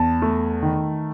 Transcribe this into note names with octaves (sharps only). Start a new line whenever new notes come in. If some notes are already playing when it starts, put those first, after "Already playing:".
Already playing: E2 A5
A3
D#3